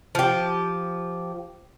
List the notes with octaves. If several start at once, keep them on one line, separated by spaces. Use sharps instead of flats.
F3 G4